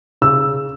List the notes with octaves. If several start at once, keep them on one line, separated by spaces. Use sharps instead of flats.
C#3 E6